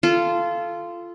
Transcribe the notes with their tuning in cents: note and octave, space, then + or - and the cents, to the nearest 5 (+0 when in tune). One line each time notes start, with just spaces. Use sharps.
F4 -15 A4 -10